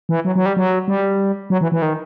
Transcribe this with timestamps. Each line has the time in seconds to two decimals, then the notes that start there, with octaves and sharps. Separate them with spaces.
0.09 E3
0.25 F#3
0.36 F#3
0.46 G3
0.57 F#3
0.88 G3
1.50 F#3
1.61 E3
1.72 E3
1.82 D#3